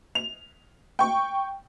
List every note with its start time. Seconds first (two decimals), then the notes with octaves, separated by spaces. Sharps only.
0.15 F7
0.99 G5 C#6